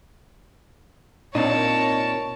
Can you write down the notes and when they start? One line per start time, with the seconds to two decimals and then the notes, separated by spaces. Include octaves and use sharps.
1.35 A#2 C4 D4 D#4 A#4 C#5 A5